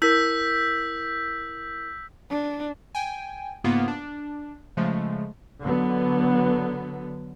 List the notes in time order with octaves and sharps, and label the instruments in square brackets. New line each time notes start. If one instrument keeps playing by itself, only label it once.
[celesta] E4 A#4 [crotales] E6 G6 B6
[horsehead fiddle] D4
[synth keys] G5 G#5
G#2 C#3 A#3 B3 F4
D4
C#3 F3 G#3 A3
[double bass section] D3 F#3 B3